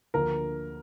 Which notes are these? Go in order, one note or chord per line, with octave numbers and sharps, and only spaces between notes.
D2 D3 F3 A#3 A#4